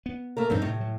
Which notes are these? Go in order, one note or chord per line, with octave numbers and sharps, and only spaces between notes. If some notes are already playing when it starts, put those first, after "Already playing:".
B3
A3 A#3 A#4
G2 E3 G#3 C4 D4 D#4
A2 C3 A3
F#3